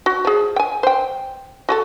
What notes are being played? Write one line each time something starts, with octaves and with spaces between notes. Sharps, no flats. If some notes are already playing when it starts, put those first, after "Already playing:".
F#4
F3 G#4
G5 G#5
C5 G5
F#4 G#4 A4